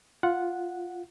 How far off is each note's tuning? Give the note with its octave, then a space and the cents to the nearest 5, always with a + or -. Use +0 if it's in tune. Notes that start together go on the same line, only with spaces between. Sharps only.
F4 +0 F#5 -5